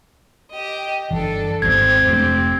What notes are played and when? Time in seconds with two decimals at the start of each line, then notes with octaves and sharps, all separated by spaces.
0.52 G4 D#5
1.10 G1 E3 D4 A4
1.62 G#1 E2 G#2 C4 G4 G#6
2.06 F1 A3 D4